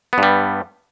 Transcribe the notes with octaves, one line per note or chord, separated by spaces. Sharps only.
G2 G3 B3